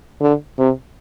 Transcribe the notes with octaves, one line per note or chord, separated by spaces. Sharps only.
D3
C3